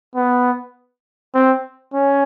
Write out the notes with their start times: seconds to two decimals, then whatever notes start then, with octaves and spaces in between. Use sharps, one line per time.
0.15 B3
1.34 C4
1.94 C#4